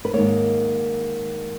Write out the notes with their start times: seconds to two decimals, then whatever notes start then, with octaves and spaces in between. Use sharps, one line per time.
0.05 B4
0.13 G#2 D#3 A#3 C#5